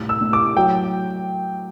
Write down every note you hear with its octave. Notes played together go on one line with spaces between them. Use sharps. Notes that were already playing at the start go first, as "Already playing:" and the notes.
Already playing: A2 C3 G3
E6
A2
D6
F#3 G5